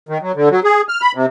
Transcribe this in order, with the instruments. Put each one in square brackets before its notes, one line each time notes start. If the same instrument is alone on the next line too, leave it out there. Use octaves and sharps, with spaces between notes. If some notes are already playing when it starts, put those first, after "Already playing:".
[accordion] D#3
F#3
D3
F#3
G#4
F6
B5
C3